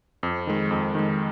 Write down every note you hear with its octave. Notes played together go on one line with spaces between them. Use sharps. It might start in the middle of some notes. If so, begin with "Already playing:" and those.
F2
D#3 G#3
F2
D#3 G#3